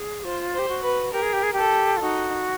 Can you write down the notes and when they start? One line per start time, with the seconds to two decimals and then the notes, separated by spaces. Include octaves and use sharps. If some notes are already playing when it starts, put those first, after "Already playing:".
Already playing: G#4
0.24 F4 C5
0.54 G4 C5
0.69 F#4
0.83 B4
1.12 G4 A#4
1.22 G#4
1.33 G4
1.43 G#4
1.53 G4 A4
1.97 F4
2.01 D#4 F#4